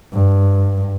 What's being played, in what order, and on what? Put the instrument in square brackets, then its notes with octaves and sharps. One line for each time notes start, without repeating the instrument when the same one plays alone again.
[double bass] G2